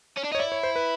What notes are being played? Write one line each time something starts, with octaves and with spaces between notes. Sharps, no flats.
C#4
D4
D#4 C#5
E4 D5
C#5
C5
B4